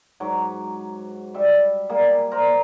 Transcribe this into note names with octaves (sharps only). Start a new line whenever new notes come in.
G#2 F#3 D6
G3 E5
G3 A#3 G#4
A#4 C5 D5